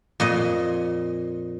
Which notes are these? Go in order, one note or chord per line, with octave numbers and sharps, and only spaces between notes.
F2 A#2 D#5